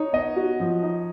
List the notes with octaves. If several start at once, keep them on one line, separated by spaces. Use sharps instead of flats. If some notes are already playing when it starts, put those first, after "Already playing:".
Already playing: D#4 C#5
B3 D#5
F#4
F3
D#4